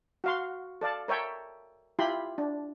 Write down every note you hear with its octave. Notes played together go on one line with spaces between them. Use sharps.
F#4 F5 C6
A4 D5 F5 A5
A#4 C#5 E5 G5 A5
E4 F4 G4 B5 C6
D4